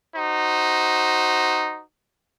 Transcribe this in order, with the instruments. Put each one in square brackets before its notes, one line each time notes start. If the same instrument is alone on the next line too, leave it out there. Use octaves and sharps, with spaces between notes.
[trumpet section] D#4 F#4 C5